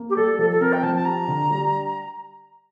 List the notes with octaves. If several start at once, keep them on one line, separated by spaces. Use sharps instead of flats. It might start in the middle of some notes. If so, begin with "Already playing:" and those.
Already playing: A#3
G4
G3 A4
F3 A4
A4
C4 A#4
G5
F3 A5
A5
G4 A#5
D3
G3